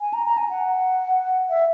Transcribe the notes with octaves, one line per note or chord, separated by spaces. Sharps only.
G#5
A#5
A#5
G#5
F#5
E5